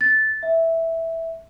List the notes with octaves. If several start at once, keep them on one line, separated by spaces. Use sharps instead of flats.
A6
E5